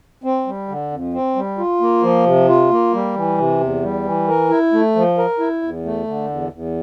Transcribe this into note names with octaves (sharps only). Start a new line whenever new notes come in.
C4
G3
D3
F2
C4
G3
F4
A#3
F3
C3
F4
A#3
G3
E3
C3
E2
G3
E3
A#4
E4
A3
F3
A#4
E4
E2
A3
D3
E2
E2